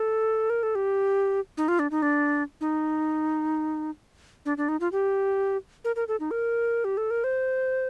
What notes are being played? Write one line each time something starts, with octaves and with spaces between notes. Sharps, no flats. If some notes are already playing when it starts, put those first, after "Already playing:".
Already playing: A4
A#4
A4
G4
D#4
F4
D4
D#4
D4
D#4
D4
D4
D#4
F4
G4
A#4
A#4
A4
D#4
A#4
G4
A4
A#4
C5